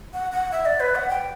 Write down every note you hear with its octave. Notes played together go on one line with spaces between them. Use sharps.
F#5
F#5
E5
D5
B4
F#5
G5